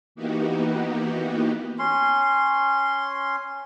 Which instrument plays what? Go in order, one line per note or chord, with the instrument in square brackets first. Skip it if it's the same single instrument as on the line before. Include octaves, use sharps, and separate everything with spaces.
[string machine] E3 A#3 B3 D#4 F#4 G4
[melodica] C#4 C6